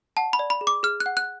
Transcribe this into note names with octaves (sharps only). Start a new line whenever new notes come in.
F#5 A5
B5
D5
B5
G#4
D6
G#4 F6
F#6
F#5
F#6